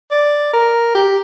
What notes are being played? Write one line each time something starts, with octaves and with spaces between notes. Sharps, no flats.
D5
A#4
G4